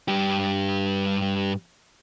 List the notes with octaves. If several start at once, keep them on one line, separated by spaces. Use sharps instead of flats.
G2 G4